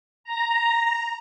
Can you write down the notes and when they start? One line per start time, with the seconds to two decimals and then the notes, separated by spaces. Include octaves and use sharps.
0.24 A#5